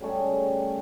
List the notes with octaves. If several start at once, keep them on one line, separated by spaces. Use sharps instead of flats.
C#3 G3 A3 G#4